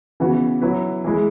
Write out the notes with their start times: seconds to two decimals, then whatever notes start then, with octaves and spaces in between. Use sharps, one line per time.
0.20 C#3 E3 B3 F#4
0.62 F#3 E4 B4
1.04 E3 G#3 E4